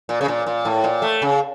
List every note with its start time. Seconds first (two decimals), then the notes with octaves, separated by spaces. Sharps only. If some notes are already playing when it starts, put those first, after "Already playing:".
0.09 A#2
0.21 C#3
0.28 A#2
0.47 A#2
0.65 A2
0.84 A#2
1.02 A3
1.22 C#3